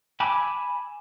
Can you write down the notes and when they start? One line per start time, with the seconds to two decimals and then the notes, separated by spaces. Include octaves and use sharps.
0.20 G#5 A5 B5 D6 E6